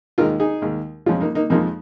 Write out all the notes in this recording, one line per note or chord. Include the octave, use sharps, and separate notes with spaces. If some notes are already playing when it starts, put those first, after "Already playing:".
D#2 D#3 G#3 F4 A#4
D#4 G#4
D#2 D#3 G#3
F2 F3 G#3 C#4 F4
A#3 D#4
A#3 D#4
F2 F3 G#3 A#3 D#4